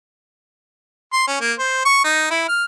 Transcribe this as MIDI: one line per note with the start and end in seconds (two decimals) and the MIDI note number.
1.13 1.25 84
1.28 1.40 61
1.41 1.53 58
1.59 1.84 72
1.85 1.99 85
2.04 2.30 63
2.30 2.44 64
2.48 2.65 89